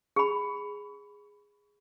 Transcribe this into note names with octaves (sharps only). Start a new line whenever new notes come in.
G#4 B5